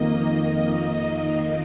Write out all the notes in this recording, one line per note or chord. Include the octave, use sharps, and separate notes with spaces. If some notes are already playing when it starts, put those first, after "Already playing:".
Already playing: F2 D#3 A#3 D#5
D#5